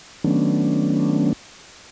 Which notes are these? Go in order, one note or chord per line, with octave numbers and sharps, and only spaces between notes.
D#3 F#3 A3 B3 C#4 D4